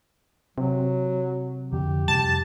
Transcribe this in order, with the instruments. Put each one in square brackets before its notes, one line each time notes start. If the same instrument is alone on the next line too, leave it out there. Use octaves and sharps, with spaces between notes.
[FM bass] C3 [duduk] F#3
[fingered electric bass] F2 D3 [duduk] G4
[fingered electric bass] F2 C3 G3 [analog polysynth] A5